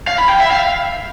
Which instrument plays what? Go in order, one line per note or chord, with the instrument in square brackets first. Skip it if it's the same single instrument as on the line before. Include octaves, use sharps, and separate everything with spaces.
[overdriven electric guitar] F5
B5
G5
E5
F5